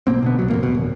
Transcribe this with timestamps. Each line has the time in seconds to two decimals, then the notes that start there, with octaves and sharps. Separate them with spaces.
0.07 B1 B2 A#3 C4
0.22 B2 D3 B3
0.39 C2 F#3
0.50 F2 G#2 G3 A#3
0.62 F1 D#2 B2
0.74 D1